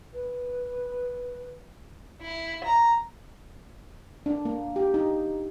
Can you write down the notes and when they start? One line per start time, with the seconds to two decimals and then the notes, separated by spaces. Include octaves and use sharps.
0.14 B4
2.22 E4
2.64 A#5
4.26 D4
4.45 A#3
4.76 G4
4.94 D#4